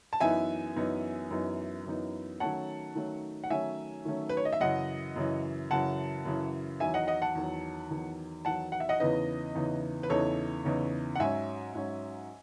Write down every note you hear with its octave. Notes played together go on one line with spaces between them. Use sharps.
A5
F#2 E3 B3 D#4 E5 G#5
F#2 E3 B3 D#4
F#2 E3 B3 D#4
F#2 E3 B3 D#4
D#3 F#3 A3 C#4 F#5 A5
D#3 F#3 A3 C#4
F#5
D#3 F#3 A3 C#4 E5 G#5
D#3 F#3 A3 C#4
B4
C#5
D#5
E5
F#2 C#3 E3 D#5 F#5
F#2 C#3 E3
F#2 C#3 E3 F#5 A5
F#2 C#3 E3
E2 D#3 F#3 E5 G#5
D#5 F#5
D#5 F#5
F#5 A5
E2 D#3 F#3
E2 D#3 F#3
E2 D#3 F#3 F#5 A5
F#5
E5
D#5 F#5
E2 C#3 E3 B3 D#4 B4 D#5
E2 C#3 E3 B3 D#4
B4
E2 C#3 E3 B3 D#4 A4 C#5
E2 C#3 E3 B3 D#4
F#5
G#2 F#3 C#4 E5 G#5
G#2 F#3 C#4